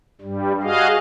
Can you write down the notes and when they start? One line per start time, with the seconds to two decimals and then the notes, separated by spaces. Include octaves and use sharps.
0.21 G2 G3
0.63 F#4 G#4 D#5 F5